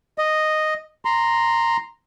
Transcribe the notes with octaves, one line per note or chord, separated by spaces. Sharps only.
D#5
A#5 C6